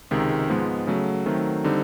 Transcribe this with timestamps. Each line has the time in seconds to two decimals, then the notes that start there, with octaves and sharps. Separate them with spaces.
0.11 C#2 C3 D#3 G#3
0.50 G#2 F3 G#3 B3
0.87 C#3 F#3 A3
1.26 D#3 F#3 A3 C4
1.64 D3 G3 C4 D#4